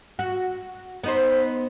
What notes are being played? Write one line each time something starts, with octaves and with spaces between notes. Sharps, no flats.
F#4
B3 D#4 C5